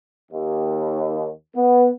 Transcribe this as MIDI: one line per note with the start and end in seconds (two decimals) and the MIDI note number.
0.32 1.28 39
1.55 1.88 59